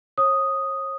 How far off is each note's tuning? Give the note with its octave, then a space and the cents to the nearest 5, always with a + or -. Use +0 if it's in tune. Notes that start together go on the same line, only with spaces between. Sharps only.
C#5 -35 D#6 +0